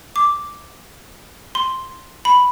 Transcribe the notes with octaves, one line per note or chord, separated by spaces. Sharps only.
D6
C6
B5